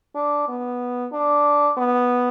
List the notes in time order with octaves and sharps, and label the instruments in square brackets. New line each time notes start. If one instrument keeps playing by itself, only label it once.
[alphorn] D4
B3
D4
B3